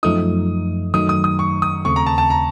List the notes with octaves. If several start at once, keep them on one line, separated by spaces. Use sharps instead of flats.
F#2 F3 A3 D#4 D#6
F#2 D#3 F#3 A3 D#4 D#6
D#6
D#6
C#6
D#6
D#2 C#3 A3 C4 C#6
A#5
A5
A5
A#5